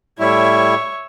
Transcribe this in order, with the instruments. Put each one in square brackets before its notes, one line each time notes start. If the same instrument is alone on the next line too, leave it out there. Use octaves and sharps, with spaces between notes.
[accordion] A2 G3 E4 [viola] C#5 E5